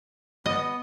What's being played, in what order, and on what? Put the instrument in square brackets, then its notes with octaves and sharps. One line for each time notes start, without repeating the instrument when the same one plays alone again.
[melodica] B3 [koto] D#5